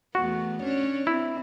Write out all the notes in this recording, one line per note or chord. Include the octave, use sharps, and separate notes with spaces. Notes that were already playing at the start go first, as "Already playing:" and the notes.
E2 A3 B3 F#4
C#4 D4 C#5
C4 E4